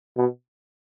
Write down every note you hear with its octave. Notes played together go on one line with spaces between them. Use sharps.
B2